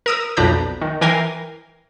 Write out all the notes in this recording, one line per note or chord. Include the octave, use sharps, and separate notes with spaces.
A#4 D#6 E6
B1 F2 D4 B4 A#5 G6
D#3
E3 A#4 G5 G#5 A#6 C7